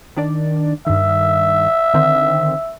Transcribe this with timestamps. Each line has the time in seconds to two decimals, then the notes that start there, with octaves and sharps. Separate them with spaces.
0.17 D#3 D4 D5
0.87 G2 D#3 E5
1.94 D3 D#3 C4